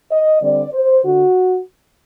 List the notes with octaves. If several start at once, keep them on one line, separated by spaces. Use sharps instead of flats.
D#5
D3 G3 C4 D5
C5
D3 F#4